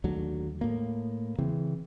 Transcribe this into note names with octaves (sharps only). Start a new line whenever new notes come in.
D#2 D3 F#3 A3
A2 A#3
C#3 E3 C4